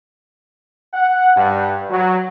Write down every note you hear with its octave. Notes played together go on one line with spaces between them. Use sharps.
F#5
G2
F#3